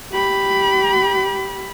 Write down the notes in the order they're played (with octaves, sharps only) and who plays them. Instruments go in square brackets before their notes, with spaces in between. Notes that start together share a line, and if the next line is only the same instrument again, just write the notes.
[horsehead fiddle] G4 B5